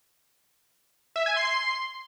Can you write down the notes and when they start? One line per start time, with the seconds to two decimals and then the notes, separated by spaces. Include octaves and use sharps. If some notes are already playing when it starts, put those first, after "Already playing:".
1.16 E5
1.26 G#5
1.36 C6